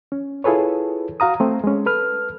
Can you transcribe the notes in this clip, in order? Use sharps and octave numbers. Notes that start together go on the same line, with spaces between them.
C#4
E4 F4 G#4 A4 B4 C#5
F#4 F5 A#5 D#6
A3 C4
G#3 C#4
A4 B4 F6